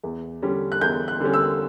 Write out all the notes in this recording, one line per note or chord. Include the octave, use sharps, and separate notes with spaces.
E2
D3 G3 C#4
F#6
E2 G6
F#6
D3 G3 C#4
E6